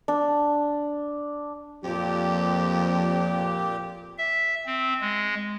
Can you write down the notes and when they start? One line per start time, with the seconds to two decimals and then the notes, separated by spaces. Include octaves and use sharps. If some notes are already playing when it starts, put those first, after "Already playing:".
0.08 D4
1.84 F2 A#2 F3 G4
4.18 E5
4.66 C4
5.01 G#3